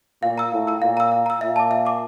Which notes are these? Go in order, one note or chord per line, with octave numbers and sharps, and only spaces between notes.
A#2 F5
A#5 E6
A2 F5
A#5 E6
A#2 F5
A#5 E6
F5
A#5 E6
A#2 E5
A5 D6
E5
A5 D6